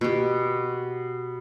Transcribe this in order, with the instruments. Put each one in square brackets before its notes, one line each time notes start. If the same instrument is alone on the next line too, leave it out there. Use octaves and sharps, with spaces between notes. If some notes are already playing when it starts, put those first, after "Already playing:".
[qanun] B2 G4